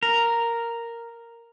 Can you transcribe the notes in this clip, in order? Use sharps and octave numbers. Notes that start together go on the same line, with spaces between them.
A#4